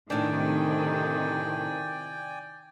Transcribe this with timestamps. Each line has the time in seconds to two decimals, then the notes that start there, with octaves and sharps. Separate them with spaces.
0.10 A2 C3 D#3 D4 D5 G5 G#5